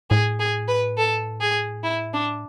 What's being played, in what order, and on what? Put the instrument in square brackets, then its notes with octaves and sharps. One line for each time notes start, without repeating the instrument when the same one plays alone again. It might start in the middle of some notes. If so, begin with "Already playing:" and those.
[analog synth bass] A2 [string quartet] G#4
[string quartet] G#4
B4
A4
G#4
E4
D4